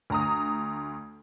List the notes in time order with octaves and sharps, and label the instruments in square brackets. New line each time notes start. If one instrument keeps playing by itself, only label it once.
[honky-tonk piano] D2 A#5 D#6